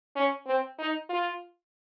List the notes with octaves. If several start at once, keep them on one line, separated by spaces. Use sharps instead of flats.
C#4
C4
D#4
F4